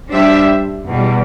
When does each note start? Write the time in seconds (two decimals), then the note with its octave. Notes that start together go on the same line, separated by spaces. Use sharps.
0.09 G3 D4 G4 C5 E5
0.86 E2 B2 G3